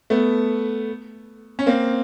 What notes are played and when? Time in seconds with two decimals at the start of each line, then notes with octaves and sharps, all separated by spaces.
0.10 A3 B3
1.59 C#4
1.66 A#3 C4